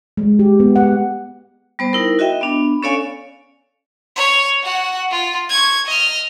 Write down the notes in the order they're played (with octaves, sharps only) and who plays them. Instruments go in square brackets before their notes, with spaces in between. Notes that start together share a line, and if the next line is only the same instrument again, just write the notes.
[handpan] G#3
G4
B3
F#5
[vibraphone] G3 B3 C5
D#4 E4 A#4
F#4 D#5 E5 G5
B3 D4 B5
C#4 A4 C#5 D5 F5 G#5
[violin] C#5
F#4 F#5
F4
C#6 G#6
D#5 F6